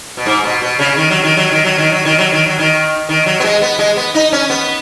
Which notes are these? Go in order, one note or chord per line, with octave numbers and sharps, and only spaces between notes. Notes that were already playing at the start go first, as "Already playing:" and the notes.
B2
G#2
B2
B2
C#3
D#3
F#3
D#3
F#3
D#3
F#3
D#3
F#3
D#3
F#3
D#3
F#3
D#3
D#3
F#3
B3
G#3
B3
G#3
B3
D#4
C#4
B3